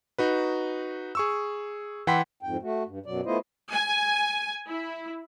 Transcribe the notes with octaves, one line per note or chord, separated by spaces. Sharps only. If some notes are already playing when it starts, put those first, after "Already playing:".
D#4 F#4 B4
G#4 C#6 E6
E3 F#5 G5 B5 C6 B6
F2 G#2 G5
A3 F#4
G2
F#2 B2 F#3 D5
A3 B3 E4 F4 C5 D#5
G#5
E4